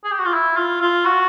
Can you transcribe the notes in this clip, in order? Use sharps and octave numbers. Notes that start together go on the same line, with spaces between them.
G#4
G4
F#4
F4
E4
F4
F4
F#4